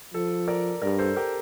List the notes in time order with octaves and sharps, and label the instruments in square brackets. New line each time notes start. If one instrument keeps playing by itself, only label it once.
[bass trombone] F3 [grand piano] A4
[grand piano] A#4 D5
[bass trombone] G2 [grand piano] A#4 D5
[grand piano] A4 C5
G4 A#4